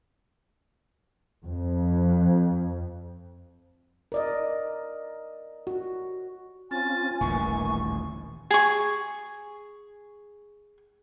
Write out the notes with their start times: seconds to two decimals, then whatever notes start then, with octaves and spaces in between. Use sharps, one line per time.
1.43 F2
4.12 A#4 D5 D#5
5.67 F#4
6.71 C4 C#4 F4 G#5 A6
7.21 D#1 A1 D3 E3 A#3 C#6
8.51 G#4 C#6